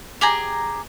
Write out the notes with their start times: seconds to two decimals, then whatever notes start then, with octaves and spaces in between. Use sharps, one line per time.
0.21 G4 G#4 A#5